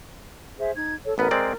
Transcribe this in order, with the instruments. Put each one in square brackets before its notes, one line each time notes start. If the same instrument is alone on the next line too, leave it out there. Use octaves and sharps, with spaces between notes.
[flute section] G#4 C5 E5
D#4 G#6
A4 C#5
[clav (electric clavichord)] A1 B3 B4 [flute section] A#4
[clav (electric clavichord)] G#3 C4 D5